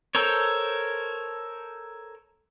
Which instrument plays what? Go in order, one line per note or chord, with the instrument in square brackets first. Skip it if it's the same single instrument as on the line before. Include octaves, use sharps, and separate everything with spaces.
[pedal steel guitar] A4 A#4 C5 C#5